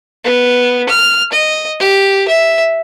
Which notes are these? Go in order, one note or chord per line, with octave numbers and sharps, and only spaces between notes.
B3
F6
D#5
G4
E5